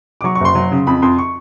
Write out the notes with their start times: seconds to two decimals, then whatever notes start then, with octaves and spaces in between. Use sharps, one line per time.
0.21 D6
0.24 F#3 C#6
0.35 C#6
0.40 F#1 C6
0.55 F#3
0.71 C#3
0.87 F2 B5
1.02 F2 C6
1.18 C#6